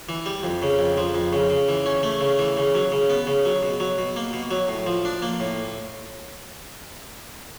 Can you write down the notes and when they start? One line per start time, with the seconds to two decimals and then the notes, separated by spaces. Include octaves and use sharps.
0.09 E3
0.26 G3
0.43 F2
0.62 C#3
0.79 F2
0.98 F3
1.15 F2
1.33 C#3
1.50 C#3
1.68 E3
1.86 C#4
2.03 A3
2.21 C#3
2.39 E3
2.57 C#3
2.75 F#3
2.92 C#3
3.10 B3
3.27 C#3
3.45 F#3
3.63 B2
3.80 F#3
3.98 B2
4.16 A#3
4.33 B2
4.51 F#3
4.68 A2
4.87 F3
5.05 D4
5.22 A#3
5.40 A2